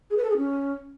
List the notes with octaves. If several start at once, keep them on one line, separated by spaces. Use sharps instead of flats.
G#4
B4
A4
G#4
C#4